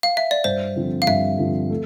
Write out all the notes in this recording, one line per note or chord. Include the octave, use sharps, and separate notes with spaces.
F5
E5
D5
G2 C5
D3 F3 C4
F5
G2 E5
D3 F3 C4
A3